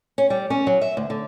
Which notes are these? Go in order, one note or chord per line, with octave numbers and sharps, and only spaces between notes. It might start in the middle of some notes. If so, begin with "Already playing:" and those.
C#4
G3
C#4
F#3
E5
D2
D3